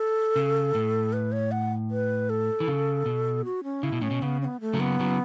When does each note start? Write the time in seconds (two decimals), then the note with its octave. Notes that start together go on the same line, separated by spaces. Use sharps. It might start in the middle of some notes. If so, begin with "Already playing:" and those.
Already playing: A4
0.36 C#3
0.75 A2
1.13 B4
1.32 C#5
1.52 F#5
1.91 B4
2.30 A4
2.60 E3
2.68 C#3
3.06 B2
3.45 F#4
3.64 C#4
3.83 C#3 E4
3.92 B2
4.01 A2 C#4
4.11 B2
4.22 C#3 B3
4.41 C#4
4.45 B3
4.61 A3
4.73 C#3 F#3
4.80 B3
5.00 C#3 F#3